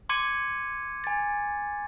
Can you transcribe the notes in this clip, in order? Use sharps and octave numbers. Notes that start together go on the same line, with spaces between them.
C6 D6 G#6 C#7 D#7
G#5 A6